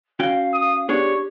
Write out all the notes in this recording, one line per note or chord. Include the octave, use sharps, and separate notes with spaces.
C#4 F#4 F5 G5
D#6
B3 D4 G4 G#4 C#5